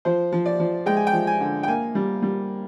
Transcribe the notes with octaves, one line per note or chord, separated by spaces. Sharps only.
F3 C5
F3
D5
F3
G#3 G5
G#5
G5
F3
G#5
D3
G5
A#3 G#5
G3
G3